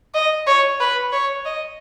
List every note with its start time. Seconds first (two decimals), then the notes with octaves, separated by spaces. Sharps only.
0.14 D#5
0.47 C#5
0.80 B4
1.13 C#5
1.45 D#5